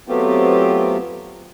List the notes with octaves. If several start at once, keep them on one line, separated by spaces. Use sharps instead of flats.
F#3 A3 B3 C4 F4 G4